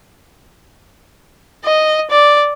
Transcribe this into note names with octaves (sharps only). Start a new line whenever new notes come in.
D#5
D5